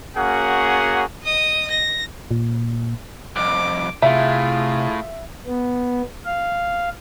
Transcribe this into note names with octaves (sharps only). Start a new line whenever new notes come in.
A#3 C#4 F#4 G#4 F#5
D#5 D#6
A#6
A#2
C2 F2 D6
A2 C3 F4 G#4 E5
B3
F5